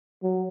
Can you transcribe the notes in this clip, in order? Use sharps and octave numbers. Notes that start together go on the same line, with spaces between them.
F#3